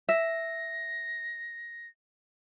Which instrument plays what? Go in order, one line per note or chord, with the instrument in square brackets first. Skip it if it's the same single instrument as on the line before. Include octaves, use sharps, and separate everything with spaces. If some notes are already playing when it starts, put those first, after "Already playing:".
[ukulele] E5 [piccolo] A#6